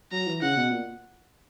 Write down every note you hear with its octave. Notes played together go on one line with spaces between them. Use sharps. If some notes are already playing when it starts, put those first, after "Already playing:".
F#3 A#5
E3
C#3 F#5
B2
A#2